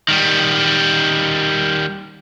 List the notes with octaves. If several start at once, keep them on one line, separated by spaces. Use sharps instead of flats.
D#3 G3